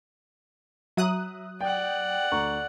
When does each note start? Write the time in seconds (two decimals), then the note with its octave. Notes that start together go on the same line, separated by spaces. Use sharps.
0.97 F#3 E5 A#5 D#6 F#6
1.61 D5 F#5 G5
2.32 D2 A#5 C#6